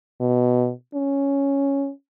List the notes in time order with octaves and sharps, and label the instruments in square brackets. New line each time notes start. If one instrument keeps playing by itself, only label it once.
[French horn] B2
C#4